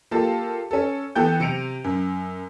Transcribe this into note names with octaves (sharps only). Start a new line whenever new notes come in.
A#3 F4 G4 A4 A5
C#4 A4
E3 B3 A4 G5 G6
C3 C#7 D7 F7
F#2